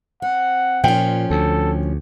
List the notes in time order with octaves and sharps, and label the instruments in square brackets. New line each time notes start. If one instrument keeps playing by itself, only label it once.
[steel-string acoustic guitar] C4 [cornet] F#5
[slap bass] A#2 [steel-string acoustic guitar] F3 C#4 [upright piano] G5
[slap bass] D2 [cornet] A4